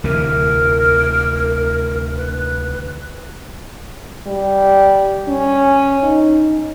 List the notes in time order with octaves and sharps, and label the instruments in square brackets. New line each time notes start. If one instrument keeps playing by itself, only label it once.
[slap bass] D2 C3 E3 [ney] A#4
[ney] B4
[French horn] G3
C#4
D#4